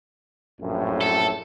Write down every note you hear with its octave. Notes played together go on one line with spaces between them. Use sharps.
A#1 F#2 A2
A4